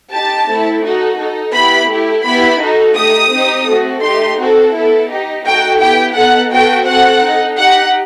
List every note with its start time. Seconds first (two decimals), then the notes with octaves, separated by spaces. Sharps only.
0.11 D#4 G4 A5
0.47 A3 C4 E4 A4
0.83 D#4 F#4 A4
1.18 D#4 A4
1.53 B3 E4 G4 B5
1.89 A3 E4 G4
2.25 B3 E4 G4 B5
2.60 D#4 F#4 A4
2.95 A3 D#4 G4 D#6
3.31 C4 D#4 G4
3.67 A3 C4 F#4 A4
4.02 A3 D#4 G4 C6
4.37 C4 F#4 A4
4.73 B3 E4 A4
5.09 D#4 G4
5.45 A3 D#4 F#4 A4 G5
5.79 B3 E4 G4 G5
6.15 B3 D#4 A4 F#5
6.50 B3 F#4 A4 G5
6.86 C4 F#4 A4 F#5
7.22 D#4 A4
7.57 D#4 G4 F#5